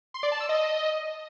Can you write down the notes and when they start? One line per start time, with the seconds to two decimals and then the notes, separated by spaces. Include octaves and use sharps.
0.14 C6
0.23 D5
0.32 A5
0.40 E6
0.49 D#5